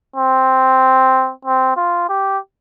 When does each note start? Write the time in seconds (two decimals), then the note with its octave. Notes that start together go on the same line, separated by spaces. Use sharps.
0.16 C4
1.45 C4
1.77 F4
2.09 G4